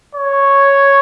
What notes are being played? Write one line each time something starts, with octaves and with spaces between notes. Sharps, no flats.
C#5